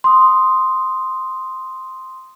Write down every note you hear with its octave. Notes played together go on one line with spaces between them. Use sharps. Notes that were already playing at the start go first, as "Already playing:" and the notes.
C6 D#6